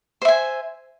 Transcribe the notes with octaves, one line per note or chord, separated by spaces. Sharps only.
C5 E5 G#5